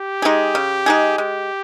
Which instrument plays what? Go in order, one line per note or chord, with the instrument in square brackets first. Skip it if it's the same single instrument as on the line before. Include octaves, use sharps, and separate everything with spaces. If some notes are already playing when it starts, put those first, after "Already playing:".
Already playing: [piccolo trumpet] G4
[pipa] G#3 D#4 G#4
C#3
G#3 D#4 G#4
[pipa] G#3 [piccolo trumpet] G4